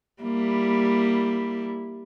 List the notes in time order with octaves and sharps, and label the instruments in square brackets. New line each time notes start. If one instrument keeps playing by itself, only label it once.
[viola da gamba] G3 A#3 E4